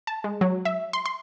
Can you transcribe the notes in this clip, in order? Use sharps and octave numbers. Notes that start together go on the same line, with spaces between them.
A5
G#3
F#3
E5
C6
C6